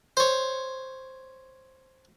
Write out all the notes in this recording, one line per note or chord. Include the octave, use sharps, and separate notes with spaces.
C5 C#5